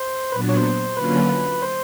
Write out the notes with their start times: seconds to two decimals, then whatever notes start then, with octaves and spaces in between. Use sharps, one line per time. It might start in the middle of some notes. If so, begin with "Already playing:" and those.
Already playing: C5
0.32 A#2 F#3 B3 D4 B4
0.49 C#5
0.57 C5
0.97 D3 F#3 A#3 C#4 F4 B4
1.62 C5